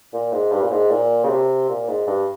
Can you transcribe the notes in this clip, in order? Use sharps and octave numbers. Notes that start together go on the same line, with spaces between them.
A#2
G#2
G2
A#2
G#2
A#2
C#3
C3
A#2
G#2
G2